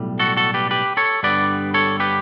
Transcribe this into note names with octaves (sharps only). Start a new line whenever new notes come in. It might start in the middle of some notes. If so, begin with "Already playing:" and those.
Already playing: B1 A2 G3
F#4 A4
F#4 A4
G4 B4
G4 B4
A4 C#5
G2 D3 G3 B3 B4 D5
A4 C#5
G4 B4